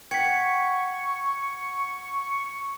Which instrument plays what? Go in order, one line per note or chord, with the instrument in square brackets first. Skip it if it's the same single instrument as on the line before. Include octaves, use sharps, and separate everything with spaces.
[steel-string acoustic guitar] F#5 [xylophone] G5 B6 [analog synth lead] C#6 [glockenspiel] G#6 C#7